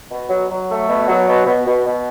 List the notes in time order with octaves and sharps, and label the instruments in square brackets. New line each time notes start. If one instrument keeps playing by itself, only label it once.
[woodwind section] B2
F#3
F#3
A3
B2
F#3
B2
B2
B2
B2